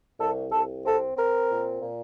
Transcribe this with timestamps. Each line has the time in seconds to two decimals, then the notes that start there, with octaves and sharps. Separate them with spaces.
0.19 C2 A4
0.51 C2 A4
0.84 C4 A4
1.16 C4 A#4
1.49 A#2
1.81 A#2